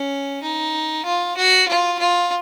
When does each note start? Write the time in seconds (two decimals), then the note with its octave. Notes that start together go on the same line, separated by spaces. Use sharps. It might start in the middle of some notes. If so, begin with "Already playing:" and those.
Already playing: C#4
0.43 D#4
1.05 F4
1.37 F#4
1.68 F4
1.99 F4